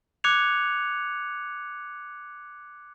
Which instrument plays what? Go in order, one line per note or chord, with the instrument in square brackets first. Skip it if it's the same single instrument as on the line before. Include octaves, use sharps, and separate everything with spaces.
[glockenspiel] D6 F#6 G#6 C#7 F7